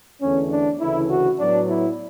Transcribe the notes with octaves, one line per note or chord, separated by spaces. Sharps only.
E2 D3 A3 C#4
D4
D2 C#3 E3 A3 E4
F#4
A2 F#3 B3 D4
E4